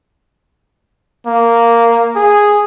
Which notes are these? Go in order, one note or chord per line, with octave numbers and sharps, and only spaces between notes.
A#3
G#4